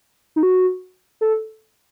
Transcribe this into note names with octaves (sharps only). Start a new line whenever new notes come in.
D#4
F#4
A4